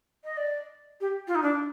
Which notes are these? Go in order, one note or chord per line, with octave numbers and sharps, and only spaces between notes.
D#5
D5
G4
F4
D#4
D4